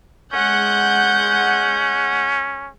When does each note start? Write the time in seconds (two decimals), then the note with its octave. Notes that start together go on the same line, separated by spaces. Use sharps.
0.33 G#3 C#4 F#5 G6